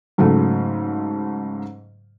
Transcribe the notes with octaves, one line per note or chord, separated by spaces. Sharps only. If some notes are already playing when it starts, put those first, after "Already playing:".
G#2 C#3 F#3 A3